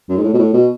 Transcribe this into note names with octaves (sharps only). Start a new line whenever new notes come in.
F#2
G#2
A2
B2
A2
B2